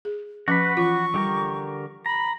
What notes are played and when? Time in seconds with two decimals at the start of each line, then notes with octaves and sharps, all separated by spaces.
0.05 G#4
0.48 F3 C#4 F#4 B4 F#5 B5 D6
0.77 E3 F4 C#6
1.14 D3 G3 G4 A#4
2.06 A#5 B5